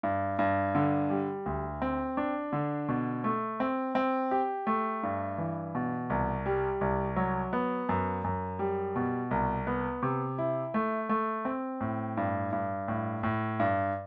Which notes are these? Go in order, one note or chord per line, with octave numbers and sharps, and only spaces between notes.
G2
G2
D3
G3
D2
C4
D4
D3
B2
A3
C4
C4
G4
A3
G2
E3
B2
C2
G3
C2
F#3
B3
F#2
F#2
G3
B2
C2
B3
C3
E4
A3
A3
C4
A2
G2
G2
A2
A2
G2